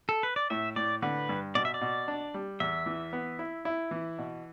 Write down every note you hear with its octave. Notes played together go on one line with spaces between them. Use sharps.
A4
B4
D5
A2 E5
A2 D5
D3 B4
G2
B2 D5
E5
D5
B2
D4
G3
E2 E5
E3
B3
E4
E4
E3
B2